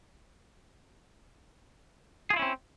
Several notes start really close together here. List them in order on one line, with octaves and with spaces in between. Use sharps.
G#4 F4 E4 C#4 C4